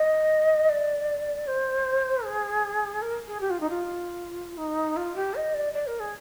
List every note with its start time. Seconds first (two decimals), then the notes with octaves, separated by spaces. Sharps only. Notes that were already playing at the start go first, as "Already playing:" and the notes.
Already playing: D#5
0.69 D5
1.47 C5
2.24 G#4
3.02 A#4
3.28 G#4
3.40 G4
3.50 F4
3.60 D#4
3.69 F4
4.57 D#4
4.96 F4
5.15 G4
5.35 D#5
5.54 D5
5.73 D5
5.87 A#4
6.00 G#4